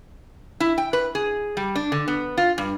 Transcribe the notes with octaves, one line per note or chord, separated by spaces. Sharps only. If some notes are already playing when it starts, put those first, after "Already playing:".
E4
G5
B4
G#4
G3
D4
D3
B3
F4
G2